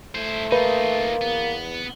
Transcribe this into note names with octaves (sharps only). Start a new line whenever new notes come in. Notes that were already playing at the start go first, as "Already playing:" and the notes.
A3 E4 C5
A#3 D#4 F4 B4
E2 B3